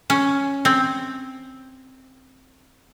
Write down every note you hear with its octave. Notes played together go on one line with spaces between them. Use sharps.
C#4
C4